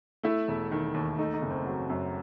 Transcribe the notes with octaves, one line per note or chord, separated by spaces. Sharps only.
A3 E4
E1
D#3
D#2
A3 D#4
D#4
F#1
C4
F#3
F#2